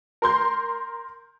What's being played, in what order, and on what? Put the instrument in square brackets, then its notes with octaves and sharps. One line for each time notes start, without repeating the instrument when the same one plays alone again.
[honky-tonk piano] A#4 C6 G6